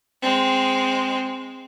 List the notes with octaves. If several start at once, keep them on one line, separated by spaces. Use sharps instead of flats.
G#3 C4